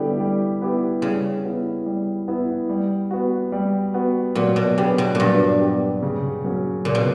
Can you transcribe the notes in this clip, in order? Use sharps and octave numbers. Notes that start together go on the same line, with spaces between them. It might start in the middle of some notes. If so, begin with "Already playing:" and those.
Already playing: D3 G3 B3 E4 G4
G3
B3 E4 G4
C#3 G3
B3 E4
G3
B3 E4
G3
B3 F#4
G3
B3 F#4
A#2 F#3
B2
C#3 B3 D4 G4
B2
G2 A#2 F#3
B3 D4 G4
C#3
F#3 A#3 C#4
A#2 C#3
B2